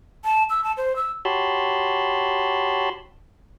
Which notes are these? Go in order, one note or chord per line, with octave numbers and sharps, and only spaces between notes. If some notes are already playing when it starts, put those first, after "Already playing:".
A5
E6
A5
C5
E6
F#4 G4 C#5 A5 B5 C6